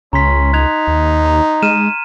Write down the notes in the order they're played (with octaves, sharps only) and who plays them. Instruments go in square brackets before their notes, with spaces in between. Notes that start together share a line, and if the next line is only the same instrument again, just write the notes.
[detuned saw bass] C#2 [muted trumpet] C#4 [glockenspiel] A#5 C6 B6
[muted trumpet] D#4 [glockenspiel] F#6 G#6 F7
[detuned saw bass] D#2
[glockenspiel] A#5
[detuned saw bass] G#3 [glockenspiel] F6 D#7 E7